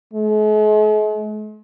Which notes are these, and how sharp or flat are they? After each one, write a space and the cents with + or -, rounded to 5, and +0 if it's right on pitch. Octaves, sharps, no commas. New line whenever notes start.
G#3 +45